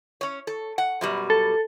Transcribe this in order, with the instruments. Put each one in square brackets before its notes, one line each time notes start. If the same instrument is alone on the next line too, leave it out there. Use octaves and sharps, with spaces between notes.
[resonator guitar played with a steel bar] C#4 C#5
A4
F#5
F#2 B2 G3
[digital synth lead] A4